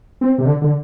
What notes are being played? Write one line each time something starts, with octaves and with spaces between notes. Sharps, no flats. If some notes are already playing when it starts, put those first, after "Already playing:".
C4
C3
D3
D3